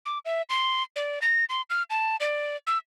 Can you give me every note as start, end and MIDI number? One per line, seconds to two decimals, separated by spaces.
0.06 0.19 86
0.25 0.42 76
0.50 0.83 84
0.96 1.19 74
1.22 1.45 94
1.49 1.62 84
1.70 1.83 89
1.90 2.16 81
2.20 2.57 74
2.67 2.78 88